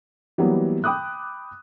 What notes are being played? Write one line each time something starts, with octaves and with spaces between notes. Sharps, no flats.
E3 F#3 G3 A#3 B3
G5 B5 D6 D#6 F#6